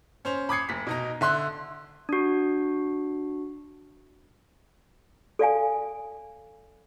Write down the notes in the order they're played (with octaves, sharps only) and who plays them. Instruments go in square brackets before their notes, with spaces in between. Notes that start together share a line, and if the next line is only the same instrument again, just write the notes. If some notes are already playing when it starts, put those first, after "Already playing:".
[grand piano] C#4 C5 F7
B5 D6 D#6 G#6 C7 C#7
F1 B6
B2 D#4 A#5
D3 E5 C6 F#6
[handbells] D4 F#4
[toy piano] A4 D5 F5 G#5